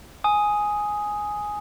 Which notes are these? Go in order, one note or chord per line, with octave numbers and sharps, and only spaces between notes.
G#5 D#6